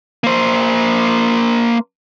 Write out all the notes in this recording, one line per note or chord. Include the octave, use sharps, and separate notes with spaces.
A#3 C5